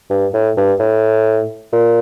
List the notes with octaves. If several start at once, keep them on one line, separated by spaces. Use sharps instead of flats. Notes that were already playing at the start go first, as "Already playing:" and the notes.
G2
A2
G2
A2
A#2